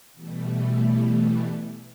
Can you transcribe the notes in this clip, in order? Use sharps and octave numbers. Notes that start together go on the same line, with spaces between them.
B2 E3 G3 A3